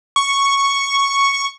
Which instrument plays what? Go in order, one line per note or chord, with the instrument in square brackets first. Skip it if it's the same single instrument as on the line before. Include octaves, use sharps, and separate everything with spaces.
[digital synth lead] C#6